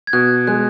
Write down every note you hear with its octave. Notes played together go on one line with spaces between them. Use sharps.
G#6
B2 F#6
G#3 F#6